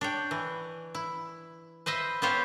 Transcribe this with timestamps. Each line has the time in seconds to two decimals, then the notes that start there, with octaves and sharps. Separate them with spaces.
0.01 D4 C#5 G5
0.31 E3
0.95 E4
1.86 B4 C5 D#5 E5
2.22 B3 E4 F4 G4 C5 C#5